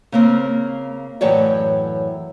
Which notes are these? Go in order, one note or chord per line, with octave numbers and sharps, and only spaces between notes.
C#3 A#3 C4
F#2 A2 E3 C#5 D5 G5